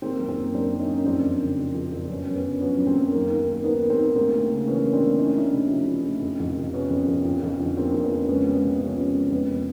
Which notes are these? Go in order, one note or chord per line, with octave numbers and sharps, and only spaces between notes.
D#3 A#3 C4
F#2
A#3 C4
D#3
F#2 C4 D4
D#3
C#4 D#4
F#2
F2 C4 D4
F2
C#3
F3
F2
F2
F#2 B3 C#4
F#2
B3 C#4
D3
F3 B3 C#4
F#2
A#3 C4
F#2
D#3 A#3
D#2
A#3
D#3
D#2 B3
D#3
A#3 C4
D#2
D2 A#3 C4
D2
C#3
E3 B3 C#4
D2
C4 D4
D2
D2 C#4 D#4
D2 D4 E4
C3 C#4 D#4
F3
D2
D2
F2
F2
C3
F3 B3 C#4
F2
F2
F2
F2
D3
F3 A#3 C4
F2 C4
B3 C#4
F2
C#2 B3 C#4
C#2
B3
C3
F3 B3 C#4
C#2
C#2
F2 B3